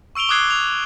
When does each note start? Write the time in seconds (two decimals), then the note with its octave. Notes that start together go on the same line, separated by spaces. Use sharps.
0.15 C#6 E6 D7 F7 G7
0.29 D6 D#6 F#6 G#6 C7
0.51 F7